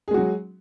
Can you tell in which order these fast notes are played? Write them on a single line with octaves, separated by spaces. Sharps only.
G#4 G#3 F#4 F#3